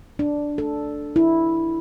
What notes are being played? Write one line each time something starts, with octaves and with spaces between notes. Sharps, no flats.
D4
A4
E4